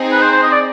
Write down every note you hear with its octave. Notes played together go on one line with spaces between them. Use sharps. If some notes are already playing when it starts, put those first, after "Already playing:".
Already playing: C4 D#4 G#4
B4
C5
C5
D#5
D5